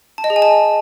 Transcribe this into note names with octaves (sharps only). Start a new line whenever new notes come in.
A5
D#5
G#4
G#5
A5